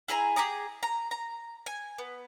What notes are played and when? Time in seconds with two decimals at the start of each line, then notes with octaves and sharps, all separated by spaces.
0.08 E4 G#4 G#5 A#5
0.36 G4 G#4 A#5 D#6
0.83 A#5
1.11 A#5
1.66 G#5
1.98 B3